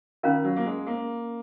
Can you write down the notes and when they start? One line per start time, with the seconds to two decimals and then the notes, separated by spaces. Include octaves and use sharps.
0.23 D#3 C#4 F4 A#4 F5 A#5
0.44 F#3
0.56 A#3
0.66 G#3
0.87 A#3